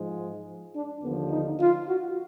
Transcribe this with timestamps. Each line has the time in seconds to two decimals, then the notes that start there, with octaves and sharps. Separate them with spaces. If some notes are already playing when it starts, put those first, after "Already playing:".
Already playing: G#2 F3 G#3
0.76 D4
1.03 D#2 D3 F3 B3
1.32 D#4
1.61 F4
1.88 F#4